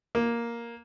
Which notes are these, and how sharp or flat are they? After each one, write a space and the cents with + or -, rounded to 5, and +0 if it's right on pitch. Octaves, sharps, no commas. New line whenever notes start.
A#3 +5